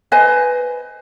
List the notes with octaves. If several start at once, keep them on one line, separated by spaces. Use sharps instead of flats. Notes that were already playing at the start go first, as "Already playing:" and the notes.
B4 C5 D#5 G#5